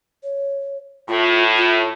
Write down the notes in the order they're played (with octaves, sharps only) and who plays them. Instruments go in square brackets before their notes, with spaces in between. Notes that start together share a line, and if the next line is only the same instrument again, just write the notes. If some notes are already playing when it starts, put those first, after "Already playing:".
[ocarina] C#5
[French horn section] A2 [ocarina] F4
[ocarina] F4